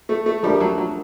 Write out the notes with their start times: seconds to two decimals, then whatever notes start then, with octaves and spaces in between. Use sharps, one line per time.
0.09 A3
0.26 A3
0.43 F3 G3 A3 D4 G4 A#4
0.55 G3
0.60 F#3
0.78 F#3